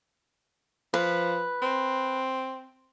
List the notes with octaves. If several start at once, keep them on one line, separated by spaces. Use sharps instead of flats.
F3 B4
C4